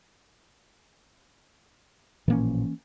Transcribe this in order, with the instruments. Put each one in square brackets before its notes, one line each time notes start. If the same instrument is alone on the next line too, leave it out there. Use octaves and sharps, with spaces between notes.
[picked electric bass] A1 A#2 F3 [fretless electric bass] E3 A#3 C#4